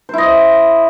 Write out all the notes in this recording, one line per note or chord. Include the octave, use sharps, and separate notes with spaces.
E4 C5 D#5